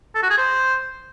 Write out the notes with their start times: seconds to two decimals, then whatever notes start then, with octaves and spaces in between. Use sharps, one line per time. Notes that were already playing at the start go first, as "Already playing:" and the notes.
0.15 A4
0.23 F#4
0.30 G#4
0.38 C5